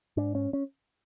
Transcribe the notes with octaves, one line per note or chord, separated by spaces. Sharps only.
G#2 D4
C#4
C#4